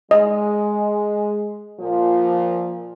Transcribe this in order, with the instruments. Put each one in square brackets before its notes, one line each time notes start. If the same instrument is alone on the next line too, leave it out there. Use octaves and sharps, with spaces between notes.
[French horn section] G#3 [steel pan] D#5
[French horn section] A#2 F3